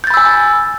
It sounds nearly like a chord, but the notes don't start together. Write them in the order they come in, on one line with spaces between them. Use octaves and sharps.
G6 A6 B5 E6 G#5